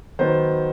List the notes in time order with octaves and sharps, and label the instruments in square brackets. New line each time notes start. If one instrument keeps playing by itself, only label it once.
[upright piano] D#3 F#3 B3 C5